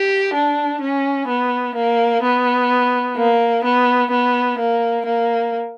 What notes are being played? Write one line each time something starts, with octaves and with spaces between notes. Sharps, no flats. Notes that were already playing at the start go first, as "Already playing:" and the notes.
Already playing: G4
D4
C#4
B3
A#3
B3
A#3
B3
B3
A#3
A#3